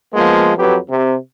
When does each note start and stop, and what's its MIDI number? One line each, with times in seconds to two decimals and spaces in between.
0.14 0.51 53
0.14 0.51 56
0.14 0.51 58
0.14 0.51 59
0.56 0.77 41
0.56 0.77 54
0.56 0.77 67
0.56 0.77 71
0.89 1.16 48